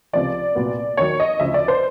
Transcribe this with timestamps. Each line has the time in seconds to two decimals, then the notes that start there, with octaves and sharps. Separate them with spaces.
0.13 C#2 C3 F3 D5
0.55 C2 A#2 F#3 B3
0.97 D#2 D#3 F#3 C#5
1.20 D#5
1.40 D2 C#3 F3 E5
1.54 D5
1.68 C5